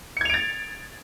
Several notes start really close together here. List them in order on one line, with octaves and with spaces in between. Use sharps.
C#7 G#6 F7 D7 A6